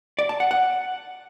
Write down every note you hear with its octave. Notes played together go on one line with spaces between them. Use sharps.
D5
A5
F#5
F#5